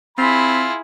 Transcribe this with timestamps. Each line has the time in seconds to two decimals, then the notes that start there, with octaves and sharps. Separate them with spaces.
0.18 C4 E4 F4 G#4 B5